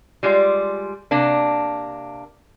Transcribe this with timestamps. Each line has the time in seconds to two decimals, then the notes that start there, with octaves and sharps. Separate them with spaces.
0.23 G3 G#3 F4 D5
1.11 C3 A#3 D4